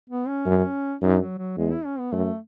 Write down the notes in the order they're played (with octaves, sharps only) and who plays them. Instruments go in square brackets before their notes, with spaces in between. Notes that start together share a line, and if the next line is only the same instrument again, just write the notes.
[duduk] B3
C#4
[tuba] F#2
[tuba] F#2 [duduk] D#4
[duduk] F#3
F#3
[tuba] E2 [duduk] G#3
[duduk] E4
C#4
B3
[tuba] F#2 [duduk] A3